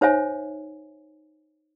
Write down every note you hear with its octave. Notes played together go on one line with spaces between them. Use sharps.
D#4 C5 C#5 E5 G#5